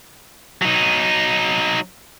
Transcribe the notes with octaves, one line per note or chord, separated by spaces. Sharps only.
F#3 D#4